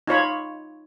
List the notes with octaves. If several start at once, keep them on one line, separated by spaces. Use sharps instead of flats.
D#4 F4 C#5 B5